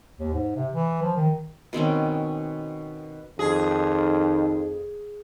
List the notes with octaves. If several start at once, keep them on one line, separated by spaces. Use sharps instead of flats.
D#2
G#2
C3
E3
F3
D#3
B2 D#3 C4 C#4
F2 D#3 F3 D#4 G#4